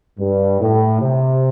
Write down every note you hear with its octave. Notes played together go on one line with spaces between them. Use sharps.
G2
A2
C3